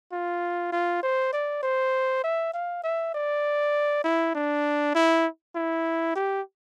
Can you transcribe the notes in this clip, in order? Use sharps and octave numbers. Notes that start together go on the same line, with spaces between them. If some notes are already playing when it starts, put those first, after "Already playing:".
F4
F4
C5
D5
C5
E5
F5
E5
D5
E4
D4
E4
E4
G4